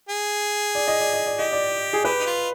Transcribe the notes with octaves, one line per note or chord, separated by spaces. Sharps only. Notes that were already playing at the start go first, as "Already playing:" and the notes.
G#4
D5
D#5
D5
D#5
D5
G4 D#5
D5
G#4
G4 B4
D#4
F4